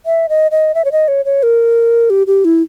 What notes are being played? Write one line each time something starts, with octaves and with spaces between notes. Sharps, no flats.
E5
D#5
D#5
E5
C#5
D#5
C#5
C#5
A#4
G4
G4
E4